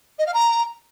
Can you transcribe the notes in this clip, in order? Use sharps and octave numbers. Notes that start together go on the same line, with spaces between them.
D#5
F5
A#5